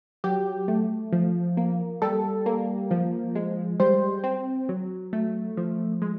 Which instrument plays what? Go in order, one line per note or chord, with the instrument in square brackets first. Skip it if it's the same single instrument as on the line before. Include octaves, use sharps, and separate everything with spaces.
[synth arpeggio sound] F#3 G4
A3
F3
A#3
G3 A4
A#3
F3
G#3
G3 C5
C4
F#3
A3
F3
G#3